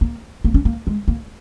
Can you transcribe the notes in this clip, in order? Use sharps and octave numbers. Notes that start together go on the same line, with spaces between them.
A#3
A#3
C#4
A#3
G#3
A#3